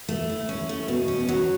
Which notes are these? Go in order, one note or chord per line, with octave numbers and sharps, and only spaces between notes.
A3
E4
C#4
A3
B2
C#4
F#3